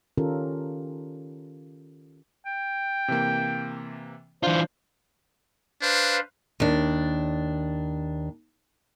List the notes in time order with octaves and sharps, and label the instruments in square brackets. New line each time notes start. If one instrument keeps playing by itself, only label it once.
[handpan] D#3 C#4 F4 G4 A4 A#4
[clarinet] G5
[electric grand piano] C3 E3 A#3
[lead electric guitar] E3 F4 [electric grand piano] D4 [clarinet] C5
[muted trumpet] D4 [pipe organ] B4 C5 F5
[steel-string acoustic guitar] D#2 D4